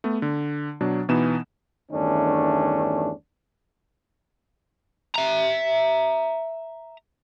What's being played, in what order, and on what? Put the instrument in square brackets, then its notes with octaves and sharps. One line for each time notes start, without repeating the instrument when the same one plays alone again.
[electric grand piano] A3 B3
D3
B2 F#3 D4
B2 E3 B3 D#4 E7
[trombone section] E2 G2 D#3 A3 C#4 D4
[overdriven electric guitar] E5 A#5